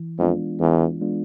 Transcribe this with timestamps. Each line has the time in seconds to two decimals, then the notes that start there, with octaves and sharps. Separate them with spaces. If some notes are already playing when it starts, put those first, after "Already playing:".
Already playing: E3
0.19 F2 G#3 B3 D4 F4
0.60 E2 E3
1.01 G#3 B3 D4 F4